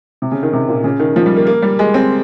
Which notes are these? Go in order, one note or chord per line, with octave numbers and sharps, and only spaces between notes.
C3
C#3
D#3
C3
A#2
C#3
D#3
F3
G3
A#3
A#3
G3
G#3
C4